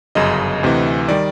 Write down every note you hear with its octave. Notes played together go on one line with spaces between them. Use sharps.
G1 F#2 C#3 D#5
D2 C3 E3
D#3 G3 D5